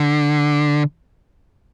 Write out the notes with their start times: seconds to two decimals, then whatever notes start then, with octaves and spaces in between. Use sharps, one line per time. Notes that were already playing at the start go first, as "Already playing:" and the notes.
Already playing: D3